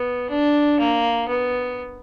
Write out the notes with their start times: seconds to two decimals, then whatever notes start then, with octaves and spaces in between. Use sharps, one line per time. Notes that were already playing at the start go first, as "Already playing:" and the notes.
Already playing: B3
0.30 D4
0.79 A#3
1.28 B3